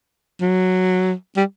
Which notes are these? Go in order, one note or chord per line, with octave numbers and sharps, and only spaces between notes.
F#3
G3